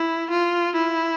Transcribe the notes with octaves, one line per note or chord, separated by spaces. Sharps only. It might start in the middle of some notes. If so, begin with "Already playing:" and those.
Already playing: E4
F4
E4